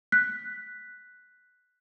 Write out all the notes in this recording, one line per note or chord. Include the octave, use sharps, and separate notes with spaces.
F#6 B6